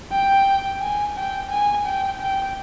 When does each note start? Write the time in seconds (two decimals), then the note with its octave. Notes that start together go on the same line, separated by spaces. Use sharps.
0.12 G5
0.81 G#5
1.16 G5
1.51 G#5
1.86 G5
2.21 G5